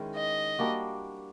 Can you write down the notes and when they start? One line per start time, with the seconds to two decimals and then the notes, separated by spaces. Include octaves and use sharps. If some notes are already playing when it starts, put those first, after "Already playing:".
Already playing: D#3 G#3 C#4 E4
0.15 D#5
0.59 G3 A#3 D4 F#4